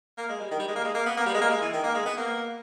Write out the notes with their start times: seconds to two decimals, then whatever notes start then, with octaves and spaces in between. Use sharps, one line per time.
0.18 A#3
0.29 G#3
0.41 G3
0.51 D#3
0.59 G3
0.68 G#3
0.76 A#3
0.84 G#3
0.95 A#3
1.06 B3
1.17 A#3
1.26 G3
1.34 G#3
1.41 A#3
1.50 G#3
1.61 E3
1.73 D#3
1.84 A#3
1.95 G#3
2.06 B3
2.17 A#3